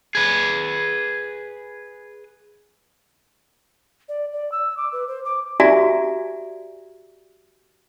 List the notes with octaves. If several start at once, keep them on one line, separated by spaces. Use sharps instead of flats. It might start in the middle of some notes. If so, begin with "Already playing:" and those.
G#4 B4
D5
D5
E6
D6
B4
C5
D6
F#4 G4 D5 E5 G#5 A#5